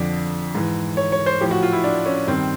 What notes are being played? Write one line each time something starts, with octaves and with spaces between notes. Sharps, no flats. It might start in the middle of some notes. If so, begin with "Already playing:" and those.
Already playing: F2 D3 F3 D5
G#2 E3
C#5
C#5
C5
A2 F3 G4
F#4
F4
E4
D4
C#4
G2 D#3 C4